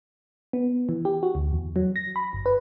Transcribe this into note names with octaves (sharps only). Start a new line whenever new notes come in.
B3
E3
G4
F#4
D2
E2
F#3
A#6
B5
G1
B4